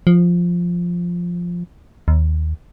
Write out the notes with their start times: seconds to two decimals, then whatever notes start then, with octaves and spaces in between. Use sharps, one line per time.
0.07 F3
2.08 D#2